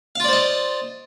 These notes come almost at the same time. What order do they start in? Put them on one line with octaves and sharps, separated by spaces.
F5 F4 D5 C5 D#5